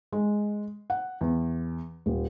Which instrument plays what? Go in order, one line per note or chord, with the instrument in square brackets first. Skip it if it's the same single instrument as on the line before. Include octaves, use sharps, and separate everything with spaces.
[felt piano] G#3
F#5
E2
D#1